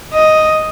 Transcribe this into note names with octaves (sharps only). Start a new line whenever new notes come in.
D#5